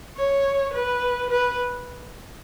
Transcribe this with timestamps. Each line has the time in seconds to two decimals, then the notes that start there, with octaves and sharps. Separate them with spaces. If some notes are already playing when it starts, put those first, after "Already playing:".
0.17 C#5
0.73 B4
1.30 B4